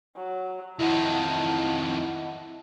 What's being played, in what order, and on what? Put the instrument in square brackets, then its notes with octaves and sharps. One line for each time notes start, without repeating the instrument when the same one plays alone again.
[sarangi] F#3
[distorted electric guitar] F2 D#3 [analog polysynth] E4 D#5 F#5 [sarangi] A5